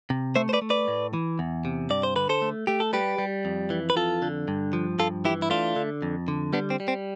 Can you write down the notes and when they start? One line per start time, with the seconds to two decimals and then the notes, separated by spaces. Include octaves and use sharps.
0.10 C3
0.36 A3 C5 E5
0.49 C5
0.53 B4 D5
0.62 A3
0.70 B4 D5
0.88 A2
1.13 E3
1.39 E2
1.65 C3
1.90 G2 D5
2.03 C5
2.16 D3 B4
2.29 A4 C5
2.42 A3
2.67 A3 G4
2.80 A4
2.93 G3 G4 B4
3.19 G3
3.45 F2
3.70 E3
3.90 B4
3.96 F2 F4 A4
4.22 D3
4.48 G2
4.73 F3
4.99 G2 F4 A4
5.25 E3 E4 G4
5.42 E4
5.50 A3 D4 F4
5.76 D3
6.02 F2
6.28 D3
6.53 G3 B3 D4
6.70 C4
6.80 G3
6.88 C4